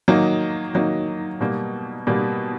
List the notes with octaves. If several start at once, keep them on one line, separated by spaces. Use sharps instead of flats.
D#3 F#3 A#3 D#4
D#3 F#3 A#3 D#4
B2 G3 A#3
B2 G3 A#3